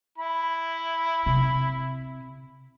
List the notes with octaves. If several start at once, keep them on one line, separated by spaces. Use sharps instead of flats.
E4 B5
C3